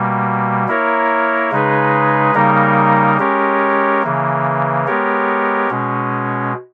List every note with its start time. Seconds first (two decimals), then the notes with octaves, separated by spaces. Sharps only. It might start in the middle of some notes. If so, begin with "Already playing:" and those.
Already playing: B2 G3 A#3
0.67 A#3 E4 A#4 C#5
1.51 C#3 G#3 D#4 G#4 B4
2.34 C#3 G3 A#3 D#4 A#4
3.19 G#3 C#4 G4 A#4 C#5
4.02 C#3 E3 A#3
4.86 G#3 B3 G4 A#4 C#5
5.70 B2 G#3 C#4